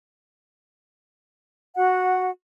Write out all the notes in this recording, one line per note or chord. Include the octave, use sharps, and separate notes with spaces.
F#4 F#5